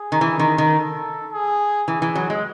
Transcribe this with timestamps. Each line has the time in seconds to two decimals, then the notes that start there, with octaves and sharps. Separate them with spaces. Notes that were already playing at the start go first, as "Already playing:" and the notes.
Already playing: G#4
0.12 D#3
0.21 E3
0.40 D#3
0.58 D#3
0.76 A4
1.32 G#4
1.88 E3 G#4
2.02 E3
2.15 F#3
2.30 G#3